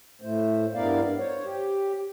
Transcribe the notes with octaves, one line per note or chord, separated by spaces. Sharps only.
A2 A3 C5
G2 B3 E4 A#4 D5 F5
C5 C#5
G4